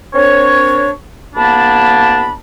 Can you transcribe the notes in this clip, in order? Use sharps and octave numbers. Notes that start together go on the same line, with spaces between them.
C4 D4 A#4 C#5
C2 A#3 B3 D4 A5 B5